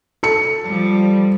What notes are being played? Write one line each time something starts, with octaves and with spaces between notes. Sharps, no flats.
A4 C#7
F3 G3